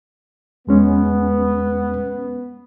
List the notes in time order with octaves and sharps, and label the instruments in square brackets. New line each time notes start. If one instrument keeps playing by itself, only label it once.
[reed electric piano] E2 G#3 C#4 [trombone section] B3